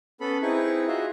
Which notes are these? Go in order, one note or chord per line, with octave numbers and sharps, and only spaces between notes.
B3 C#4 A4 B5
C4 D#4 E4 G#4 B4 C#6
F4 F#4 G#4 D#5 E5